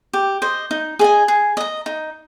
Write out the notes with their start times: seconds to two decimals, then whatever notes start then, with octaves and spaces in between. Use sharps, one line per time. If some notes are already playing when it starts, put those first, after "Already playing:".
0.13 G4
0.42 C5 D#5
0.71 D#4
0.99 G#4 D#5 G#5
1.28 G#4
1.57 D#5 A#5
1.86 D#4